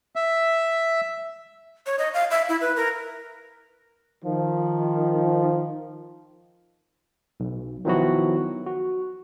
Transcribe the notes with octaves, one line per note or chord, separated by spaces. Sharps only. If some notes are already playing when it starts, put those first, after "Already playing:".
E5
C#5
D#5
F5
E5
E4
B4
A#4
D#3 F3
B1
D#3 F3 F#3 B3 E4 F#4
F#4